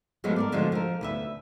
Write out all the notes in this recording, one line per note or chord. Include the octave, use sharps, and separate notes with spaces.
F3 F#3 G#3 A3 B3
A#4 C5 D5
D3 F3 G#3 D4 F4 F#4
F3 A#4
D2 B4 E5